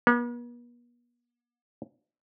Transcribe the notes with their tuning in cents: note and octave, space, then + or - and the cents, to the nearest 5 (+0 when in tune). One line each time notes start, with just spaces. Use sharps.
B3 -45